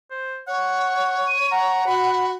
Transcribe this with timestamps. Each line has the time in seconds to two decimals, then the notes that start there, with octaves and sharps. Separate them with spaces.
0.11 C5
0.47 C#5 F#5
1.28 D#7
1.51 F#5 A#5
1.86 F#4 B5